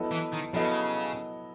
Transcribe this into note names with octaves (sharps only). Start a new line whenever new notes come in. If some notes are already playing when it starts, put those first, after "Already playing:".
Already playing: F#3 B3 E4 A4 D#5
E3
D#3
C#3 F#3 B3 E4 A4 D#5